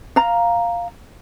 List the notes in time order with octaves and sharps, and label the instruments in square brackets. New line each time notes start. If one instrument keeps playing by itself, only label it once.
[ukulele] F5 A#5